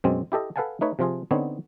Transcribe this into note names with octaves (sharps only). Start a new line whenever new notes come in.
F#2 B2 G#3 C4
E4 G4 A4 D#5
A4 B4 F5 F#5 G#5 A5
A3 D#4 B4 C#5
C3 F3 F4 G#4
D3 B3 C4 D#4 C#5